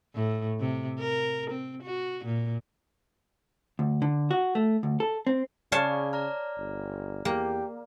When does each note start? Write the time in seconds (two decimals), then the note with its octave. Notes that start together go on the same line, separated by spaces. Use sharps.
0.15 A2
0.60 C3
0.99 A#4
1.50 C4
1.83 F#4
2.25 A#2
3.79 D2
4.02 D3
4.31 F#4
4.55 A3
4.83 D2
5.00 A4
5.27 C4
5.72 C#3 C#5 D5 F5 A5
6.13 D5 A#5 F6
6.58 G1
7.25 E2 A#3 G4